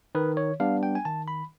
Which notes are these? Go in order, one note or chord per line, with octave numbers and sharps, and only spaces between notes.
D#3 B4
C#5
G3 B3 D4 F5
G5
G#5
D#3 A5
B5